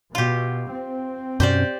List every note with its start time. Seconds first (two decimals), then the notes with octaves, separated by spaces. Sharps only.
0.15 B2 F4 G4
0.71 C4
1.40 F#2 B2 C#4 G4 C5 D5